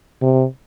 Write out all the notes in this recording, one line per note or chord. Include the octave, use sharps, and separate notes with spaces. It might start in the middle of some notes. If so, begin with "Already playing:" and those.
C3